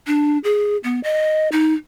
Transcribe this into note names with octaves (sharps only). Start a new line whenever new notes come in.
D4
G#4
B3
D#5
D#4